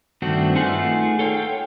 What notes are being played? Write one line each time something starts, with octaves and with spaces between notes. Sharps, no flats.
G2 D#3 A3 C4 D4 F#4
A3 D#4 F4 G#4 B4 F#5
A4 C#5 F5 G5